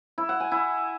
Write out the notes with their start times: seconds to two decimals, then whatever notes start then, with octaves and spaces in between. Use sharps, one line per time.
0.18 E4
0.29 F#5
0.40 G#5
0.52 E4